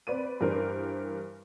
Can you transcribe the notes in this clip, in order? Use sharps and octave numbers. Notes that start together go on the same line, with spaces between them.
C4 B4 D5 D#7
G2 E3 A#4 C5